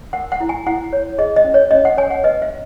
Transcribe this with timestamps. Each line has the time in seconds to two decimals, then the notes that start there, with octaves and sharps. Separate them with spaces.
0.13 A#4 F#5
0.32 F#5
0.40 E4
0.49 G#5
0.66 E4 F#5
0.93 C#5
1.18 G#4 D#5
1.36 D#5
1.44 C#4
1.54 C#5
1.71 C#4 D#5
1.85 F#5
1.97 C#5 G#5
2.11 F#5
2.24 B4 D#5
2.42 E5